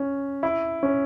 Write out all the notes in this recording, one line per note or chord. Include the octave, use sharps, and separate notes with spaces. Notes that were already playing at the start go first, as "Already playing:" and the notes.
Already playing: C#4
E4
C#4